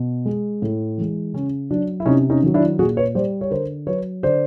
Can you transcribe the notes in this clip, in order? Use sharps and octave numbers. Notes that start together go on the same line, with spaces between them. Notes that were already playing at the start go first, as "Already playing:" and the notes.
Already playing: B2
G#3
A2
E3 G#3
C#3 C#4
F#3 D4
E4
C3 C#4 D#4
C#4 D#4
D#3 F#3
D4 E4
A#2 F#4 G#4
B4 C#5
G3 C5 D5
C#5
D3 A#4 C5
F#3 B4 C#5
D3 C5 D5